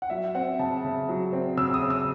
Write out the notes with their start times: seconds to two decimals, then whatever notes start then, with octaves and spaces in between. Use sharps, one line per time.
0.02 F#5
0.10 F#3 E5
0.35 C4 F#5
0.59 C#3 A5
0.84 C#3
1.09 F#3
1.33 C4
1.57 C#3 E6
1.74 D#6
1.82 C#3
1.90 E6